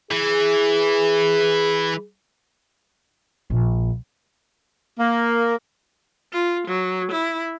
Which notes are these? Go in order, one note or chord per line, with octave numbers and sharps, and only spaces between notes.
E3 G#4
A#1
A#3
F4
F#3
E4